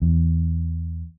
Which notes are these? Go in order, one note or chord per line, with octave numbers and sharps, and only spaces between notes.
E2